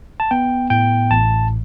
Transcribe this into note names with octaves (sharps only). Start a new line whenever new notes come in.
A5
B3 G5
A2 G5
A1 A5